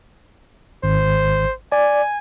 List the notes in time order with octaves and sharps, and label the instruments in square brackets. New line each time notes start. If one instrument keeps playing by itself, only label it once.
[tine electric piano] G#1 [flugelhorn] C5
[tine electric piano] D5 [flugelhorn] G#5